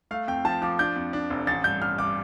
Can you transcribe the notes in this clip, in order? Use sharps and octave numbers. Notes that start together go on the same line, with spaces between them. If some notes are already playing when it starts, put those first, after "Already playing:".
A3 F5
F2 G5
F3 A5
F3 D6
D4 G6
F2
D4
F1
A1 A6
G2 G6
A1 F6
G2 D6